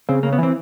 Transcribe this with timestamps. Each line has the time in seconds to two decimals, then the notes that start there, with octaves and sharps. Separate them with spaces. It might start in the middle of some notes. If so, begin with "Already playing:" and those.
0.09 C#3 C4
0.23 C#3 A#3
0.33 B3
0.38 E3 C4